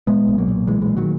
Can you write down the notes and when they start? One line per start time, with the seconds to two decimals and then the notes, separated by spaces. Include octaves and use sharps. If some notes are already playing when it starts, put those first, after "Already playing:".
0.07 A#2 G#3 B3
0.28 B1
0.38 F#3 A#3
0.48 A#2
0.67 B1 E3 G#3
0.81 E3 G#3
0.87 A#2
0.97 D#3 F#3